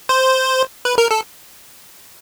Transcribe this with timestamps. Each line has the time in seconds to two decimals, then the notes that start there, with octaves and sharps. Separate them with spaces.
0.09 C5
0.85 B4
0.98 A#4
1.11 A4